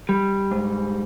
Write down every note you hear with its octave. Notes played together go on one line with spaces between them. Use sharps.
G3
G#2